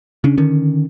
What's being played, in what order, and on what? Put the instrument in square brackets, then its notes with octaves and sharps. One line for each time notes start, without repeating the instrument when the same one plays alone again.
[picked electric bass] C#3 C#4 D4
D3 D#3 C#4